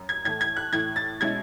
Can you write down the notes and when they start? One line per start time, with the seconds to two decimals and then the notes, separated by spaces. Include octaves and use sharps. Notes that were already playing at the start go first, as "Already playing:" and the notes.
Already playing: F#2
0.09 G#6
0.24 A2 E3 A3 G#6
0.41 G#6
0.57 F#6
0.72 A2 E3 A3 G#6
0.96 A6
1.21 B2 G#3 C#4 E4 G#6